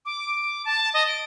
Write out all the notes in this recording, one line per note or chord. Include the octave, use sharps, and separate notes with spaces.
D6
A5
D#5
D7